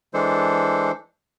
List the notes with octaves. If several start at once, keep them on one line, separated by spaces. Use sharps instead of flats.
E3 G#3 D4 A4 C5